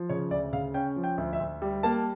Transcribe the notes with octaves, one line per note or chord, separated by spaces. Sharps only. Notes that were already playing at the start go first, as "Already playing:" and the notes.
Already playing: F3
C#3 C#5
D2 D5
C#3 F5
C#4 G5
F3
G5
D2
E5
D2
G3
A#3 A5